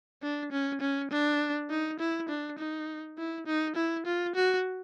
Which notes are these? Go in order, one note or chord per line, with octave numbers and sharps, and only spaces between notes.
D4
C#4
C#4
D4
D#4
E4
D4
D#4
E4
D#4
E4
F4
F#4